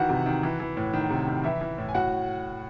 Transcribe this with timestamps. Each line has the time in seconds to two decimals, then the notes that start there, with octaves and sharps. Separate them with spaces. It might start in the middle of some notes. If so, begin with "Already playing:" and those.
Already playing: D#3 E3 F#4 F#5
0.09 C3
0.26 D#3
0.43 E3
0.60 E3
0.77 A2
0.93 D#3
1.10 C3
1.28 D#3
1.43 E3 E4 E5
1.61 E3
1.78 A2
1.89 G#5
1.95 A2 F#4 F#5